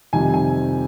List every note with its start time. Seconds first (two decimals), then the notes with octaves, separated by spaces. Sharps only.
0.13 F2 C3 D#3 G3 G#5
0.34 G#5